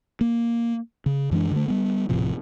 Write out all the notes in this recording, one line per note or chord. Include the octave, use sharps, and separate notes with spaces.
A#3
C#3
F#2 E3 G#3 D4
D3 A3
G3 B3
D#1 A2 C3 F3